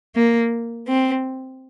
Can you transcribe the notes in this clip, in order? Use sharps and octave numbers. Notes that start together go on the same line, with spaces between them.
A#3
C4